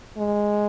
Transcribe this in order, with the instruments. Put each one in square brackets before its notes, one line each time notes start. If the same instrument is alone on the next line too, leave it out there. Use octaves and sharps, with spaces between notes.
[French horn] G#3